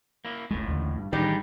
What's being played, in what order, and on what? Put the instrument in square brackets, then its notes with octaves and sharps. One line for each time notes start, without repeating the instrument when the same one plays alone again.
[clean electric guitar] A#3 E4
[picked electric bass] D1 G1 G#3 [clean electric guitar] C#2 A2
[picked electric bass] A1 D#2 D3
G2
[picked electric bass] A1 D#3 [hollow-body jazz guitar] G3 D#4 [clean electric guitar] G#3 D4 G4